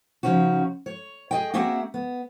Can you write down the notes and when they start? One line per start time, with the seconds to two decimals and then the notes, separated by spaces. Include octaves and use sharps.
0.23 C#3 F3 C#4 D#4 F#4
0.86 C#5
1.31 G#4 D#5 G5
1.54 A#3 C4 F#4 G#4 E5 F#5
1.94 B3